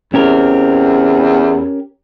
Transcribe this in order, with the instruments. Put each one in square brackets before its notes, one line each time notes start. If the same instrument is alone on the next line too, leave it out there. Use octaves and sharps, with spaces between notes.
[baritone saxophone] E2 [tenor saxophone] C4 [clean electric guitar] C#4 G4 A#4